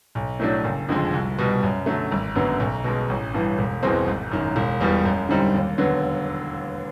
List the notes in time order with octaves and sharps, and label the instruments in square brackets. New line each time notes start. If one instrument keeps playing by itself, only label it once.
[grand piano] B1
A2 F#3 A3 D4
F#1
F2 D3 F3 G#3
C2
B2 G3
F#2
D3 F#3 A3
G#1
F#2 D3 F#3 B3
B1
B2 G#3
A1
G2 E3
E1
E2 B2 G#3 C4
G#1
F#2 D#3
E1
E2 B2 G3
F#2
D3 G3 C4 D#4
D#2
D3 F#3 B3